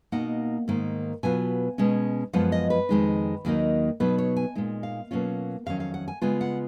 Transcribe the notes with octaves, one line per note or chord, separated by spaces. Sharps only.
B2 A#3 D#4 F#5
G#2 D#3 A#3
B2 F#3 B3 F4 G#5
B2 G#3 C#4
F#2 F3 G#3 B3 F4 F#5
D#5
B4
F2 D#3 G#3 D#4
D#2 D#3 F#3 A#3 D#4
B2 F#3 B3 D#4 B4
C#5
G#5
A#2 G#3 D#4
F5
B2 F#3 A#3 C#4 F4
F2 D#3 F#3 C#4 F5
F5
F#5
G#5
C#3 G#3 B3 F4 G#5
F#5